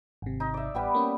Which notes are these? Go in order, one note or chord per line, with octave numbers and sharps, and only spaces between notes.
G#1 C3
D#4
D5 E5
A1 G3 B3 G4
A#3 C#4